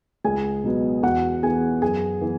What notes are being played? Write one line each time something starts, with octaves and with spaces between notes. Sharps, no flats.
C#2 G#4 G#5
B2 F#3 B3
E2 F#4 F#5
E3 B3 G#4 G#5
F#2 G#4 G#5
E3 B3